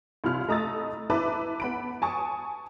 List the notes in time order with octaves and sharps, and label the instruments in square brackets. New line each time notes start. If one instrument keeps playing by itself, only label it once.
[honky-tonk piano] C2 F4 F6
A3 D#5 A#5 D#6 E6 A6
E4 B4 E5 A5 A#5 D6
B3 B5 D7
G#5 A5 C#6 D#6